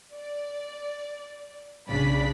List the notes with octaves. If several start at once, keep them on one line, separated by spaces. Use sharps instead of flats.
D5
B1 C#3 D4 D5 B5 B6